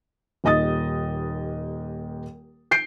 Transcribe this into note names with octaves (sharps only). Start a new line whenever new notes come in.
D#1 D#2 D#5 D#6 A6
G6 C7 D7